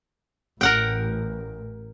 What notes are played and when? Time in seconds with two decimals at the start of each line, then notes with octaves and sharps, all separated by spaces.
0.61 A1 A#4 F#5 G5